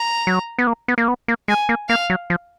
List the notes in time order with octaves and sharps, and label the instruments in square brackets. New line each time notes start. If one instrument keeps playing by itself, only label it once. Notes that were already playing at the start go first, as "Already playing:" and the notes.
Already playing: [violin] A#5
[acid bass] F#3
B3
A#3
B3
A#3
B3
A#3
[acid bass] G#3 [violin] G#5
[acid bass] A#3
[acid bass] A#3 [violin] F5
[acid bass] F#3
F3